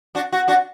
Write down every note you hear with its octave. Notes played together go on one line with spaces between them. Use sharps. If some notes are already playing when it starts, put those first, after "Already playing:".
D4 F#4
F#4
D4 F#4